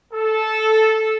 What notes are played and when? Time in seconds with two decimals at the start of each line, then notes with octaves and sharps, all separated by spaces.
0.14 A4